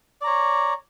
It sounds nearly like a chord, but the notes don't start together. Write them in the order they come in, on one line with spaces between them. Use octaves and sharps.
D5 A#5 C#5